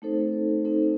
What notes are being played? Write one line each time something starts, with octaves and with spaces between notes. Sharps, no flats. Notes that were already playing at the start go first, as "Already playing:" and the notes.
A3 C4 D#4 A4 C5
A3 C4 D#4 A4 C5